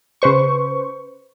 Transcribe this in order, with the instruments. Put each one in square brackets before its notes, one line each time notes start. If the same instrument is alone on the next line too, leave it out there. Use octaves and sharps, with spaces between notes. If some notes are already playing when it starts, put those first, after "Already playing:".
[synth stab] C#3 B4 C5 C#6